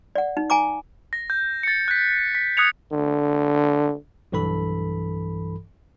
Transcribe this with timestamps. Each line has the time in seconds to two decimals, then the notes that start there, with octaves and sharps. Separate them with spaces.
0.15 D5 F#5
0.37 D#4
0.50 G#5 A#5 D6
1.13 A#6
1.30 G6
1.63 A6 C#7
1.88 F#6 B6
2.35 B6
2.57 D#6 F#6 G#6 C#7 F7
2.92 D3
4.32 B1 G2 E3 A4 B5